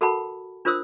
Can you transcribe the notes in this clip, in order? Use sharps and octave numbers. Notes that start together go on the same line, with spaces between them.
F#4 A4 A#4 F#5 A5 B5
D4 F4 A#4 C5 D#6 E6